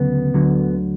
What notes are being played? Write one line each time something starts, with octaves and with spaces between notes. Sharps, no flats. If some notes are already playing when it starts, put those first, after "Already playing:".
Already playing: D2 C#3 F#3 B3
D2 D3 F#3